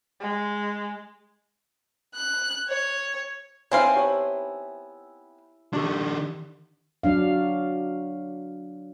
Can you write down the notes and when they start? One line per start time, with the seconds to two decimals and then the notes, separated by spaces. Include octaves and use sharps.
0.20 G#3
2.14 F#6
2.69 C#5
3.71 B3 C4 D#4 E4 C#5 F5 G#5
3.96 G4 C#5 A5
5.73 D#3 D4 D#4 G4 A#4
7.03 F#3 D4 F5